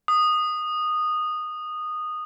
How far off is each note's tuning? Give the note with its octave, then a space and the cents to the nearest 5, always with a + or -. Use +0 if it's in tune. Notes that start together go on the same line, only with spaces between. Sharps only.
D#6 -15